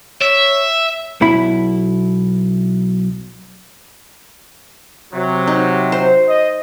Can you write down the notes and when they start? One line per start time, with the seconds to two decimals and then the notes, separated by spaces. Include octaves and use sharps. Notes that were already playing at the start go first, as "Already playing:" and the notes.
0.21 C#5 E5
1.21 B1 B2 E4 B5
5.13 C3 F#3
5.47 D#4
5.92 C5
6.28 D#5